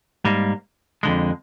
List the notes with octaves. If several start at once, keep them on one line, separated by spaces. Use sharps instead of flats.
G#2 G3 A#3
F2 D3 G#3